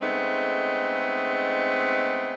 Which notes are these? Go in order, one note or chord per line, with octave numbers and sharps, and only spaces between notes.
C#3 G#3 A3 B3 C4 D#4